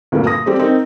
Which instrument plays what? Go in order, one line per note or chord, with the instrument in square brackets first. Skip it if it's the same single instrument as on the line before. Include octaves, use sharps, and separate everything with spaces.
[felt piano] D2 G2 A#2 F#3 A3 A#3
D#6 A#6
G3 C4 G4 A4 C5
C4 D#4 A#4